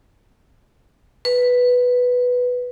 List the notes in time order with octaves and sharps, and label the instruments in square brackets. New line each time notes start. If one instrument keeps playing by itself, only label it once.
[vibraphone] B4